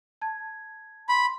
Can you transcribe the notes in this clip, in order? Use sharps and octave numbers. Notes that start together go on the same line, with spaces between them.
A5 G#6
B5 C6